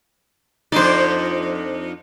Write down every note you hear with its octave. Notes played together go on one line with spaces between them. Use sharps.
F2 D4 D#4 C5 D5